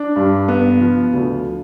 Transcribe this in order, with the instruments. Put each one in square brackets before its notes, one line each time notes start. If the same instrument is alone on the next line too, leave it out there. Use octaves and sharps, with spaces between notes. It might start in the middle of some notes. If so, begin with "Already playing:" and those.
Already playing: [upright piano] D4
G2
B3
F3
D2